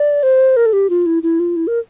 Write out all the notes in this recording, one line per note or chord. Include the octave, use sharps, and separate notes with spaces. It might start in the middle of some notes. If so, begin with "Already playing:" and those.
Already playing: D5
C5
A#4
A4
G4
F4
E4
E4
F4
E4
A#4